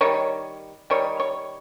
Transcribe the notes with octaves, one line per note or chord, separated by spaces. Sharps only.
D#3 G3 C#5
D#3 G3 C#5
C#5